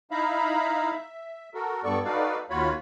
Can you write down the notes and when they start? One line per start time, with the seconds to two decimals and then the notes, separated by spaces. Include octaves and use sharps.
0.11 D#4 E4 E5 F5 A#5 B5
0.94 E5
1.54 F#4 A4 A#4
1.84 G2 B3 A4 D5 C#6
2.05 D#4 F#4 A4 B4 D5 F5
2.50 D#2 F4 F#4 C#5 B5